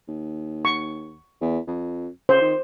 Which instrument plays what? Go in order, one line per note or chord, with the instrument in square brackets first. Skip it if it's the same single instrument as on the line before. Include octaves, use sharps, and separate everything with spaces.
[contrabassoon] D#2
[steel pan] C#6
[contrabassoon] E2
F2
[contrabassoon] C#3 [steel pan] C5
[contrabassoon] D#3